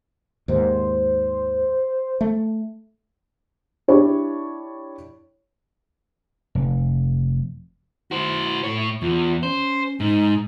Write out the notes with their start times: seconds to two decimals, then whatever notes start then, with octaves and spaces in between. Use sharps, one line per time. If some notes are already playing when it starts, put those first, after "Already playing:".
0.48 D#2 G#2 C5
2.21 A3
3.88 D4 E4 G4 C#5 D5
6.55 F1
8.11 E4 F#4 C5
8.64 A2 C#5
9.02 E2 F4
9.43 C#4 C5
10.00 G#2 D#4